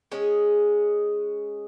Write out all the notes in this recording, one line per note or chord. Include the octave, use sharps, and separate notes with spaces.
G#3 C#4 G#4